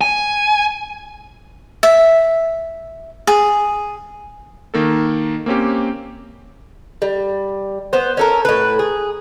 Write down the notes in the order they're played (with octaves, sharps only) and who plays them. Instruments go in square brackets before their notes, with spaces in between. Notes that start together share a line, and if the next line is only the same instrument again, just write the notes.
[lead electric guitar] G#5
[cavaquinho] E5
G#4
[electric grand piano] D#3 A#3 A4
A#3 C4 C#4 G4
[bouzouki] G3
B3 C5
C#4 A4 A#4
A2 B4
G#4